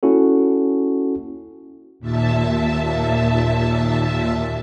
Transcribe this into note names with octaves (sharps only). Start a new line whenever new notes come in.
A#3 C#4 E4 F#4 A4
D#2 A#2 E5 A5